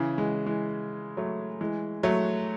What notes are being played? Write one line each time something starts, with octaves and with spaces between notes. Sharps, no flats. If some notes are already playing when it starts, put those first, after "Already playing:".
Already playing: C#3 E3
E3 G#3
E3 G#3
F#3 A3
E3 G#3
F#3 A3